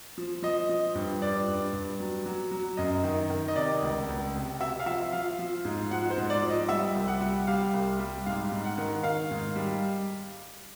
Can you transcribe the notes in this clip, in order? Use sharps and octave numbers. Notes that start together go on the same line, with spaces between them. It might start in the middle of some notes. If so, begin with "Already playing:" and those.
F3
F3 D#5
F3
G2
G2 D5
G2
G2
F#3
F#3
F#3
F#2 D#5
D#3
D#3
D#5
C3 D5
C#2
C#2
C3
C3 E5
F5
F3 E5
F3 F5
F3
G#2
F3 F#5
C5
G#2
D5
F3
D#5
G3 E5
C2
F#5
G3
G3 F5
C2
G3
G#2 F5
G#2
F#5
D#3
D#3 F5
G#2
G3